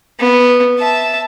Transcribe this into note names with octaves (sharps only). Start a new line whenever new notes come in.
B3
E5 A5